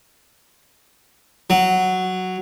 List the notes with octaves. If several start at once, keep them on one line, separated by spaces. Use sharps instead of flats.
F#3